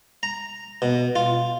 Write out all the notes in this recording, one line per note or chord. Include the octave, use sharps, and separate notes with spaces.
A#5
B2
F4